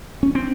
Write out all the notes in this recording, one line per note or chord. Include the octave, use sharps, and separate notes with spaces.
C#4
C4